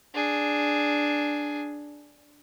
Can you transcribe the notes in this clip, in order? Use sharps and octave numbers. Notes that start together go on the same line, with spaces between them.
D4 G#4